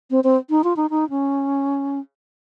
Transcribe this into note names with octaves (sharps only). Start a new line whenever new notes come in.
C4
C4
D#4
F4
D#4
D#4
C#4